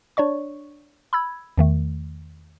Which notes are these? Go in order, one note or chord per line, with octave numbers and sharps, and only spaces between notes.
D4 C#5 D5 C#6
B5 E6 G#6
E2 D#3 A3